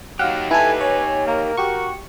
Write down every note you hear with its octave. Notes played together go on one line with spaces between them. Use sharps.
F#3 D#4 G4 F5 F#5
E4 A4 B4 G#5
C#5 G#5
A#3 A#4
F#4 G4 C#6